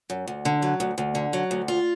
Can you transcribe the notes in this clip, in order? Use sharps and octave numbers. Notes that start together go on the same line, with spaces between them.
F#2
D2
D3
F#3
D2
D2
D3
F#3
D2
F4